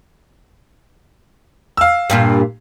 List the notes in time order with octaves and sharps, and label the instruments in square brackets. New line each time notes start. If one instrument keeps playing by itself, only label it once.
[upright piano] F5 E6
[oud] G2 A#2 F4